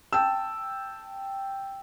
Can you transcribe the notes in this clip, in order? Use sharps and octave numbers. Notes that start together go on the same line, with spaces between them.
G5 A5 E6